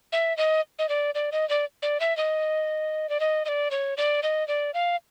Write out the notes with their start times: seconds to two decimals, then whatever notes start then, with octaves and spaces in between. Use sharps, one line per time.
0.12 E5
0.37 D#5
0.79 D#5
0.89 D5
1.15 D5
1.32 D#5
1.49 D5
1.82 D5
2.00 E5
2.17 D#5
3.09 D5
3.20 D#5
3.45 D#5
3.49 D5
3.71 C#5
3.97 D5
4.23 D#5
4.48 D5
4.74 F5